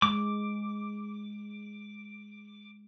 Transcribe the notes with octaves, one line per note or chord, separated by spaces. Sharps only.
G#3 D6